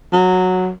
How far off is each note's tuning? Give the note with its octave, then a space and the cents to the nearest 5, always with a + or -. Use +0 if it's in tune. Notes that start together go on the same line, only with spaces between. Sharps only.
F#3 -10